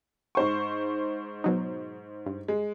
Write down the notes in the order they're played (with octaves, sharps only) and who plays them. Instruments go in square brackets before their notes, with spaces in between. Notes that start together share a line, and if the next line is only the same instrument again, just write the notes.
[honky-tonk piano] G#2 C5 C#6
[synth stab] B2 F#3 D#4
G2
[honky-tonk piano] G#3